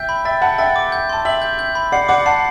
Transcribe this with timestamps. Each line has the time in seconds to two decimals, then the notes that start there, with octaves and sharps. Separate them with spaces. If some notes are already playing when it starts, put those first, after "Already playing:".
Already playing: E5 G5 G6
0.09 B5
0.25 E5 G5 A6
0.42 F#5 A5 B5
0.58 E5 G5 A6
0.76 D6
0.92 G6
1.09 A5 C6
1.25 E5 G5 F#7
1.42 G6
1.59 G6
1.75 B5
1.92 D5 F#5 C7
2.08 D5 F#5 D6
2.26 F#5 A5 C7